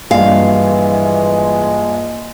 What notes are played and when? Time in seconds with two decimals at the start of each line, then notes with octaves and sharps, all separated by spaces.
0.11 A#1 G2 E3 G#3 F5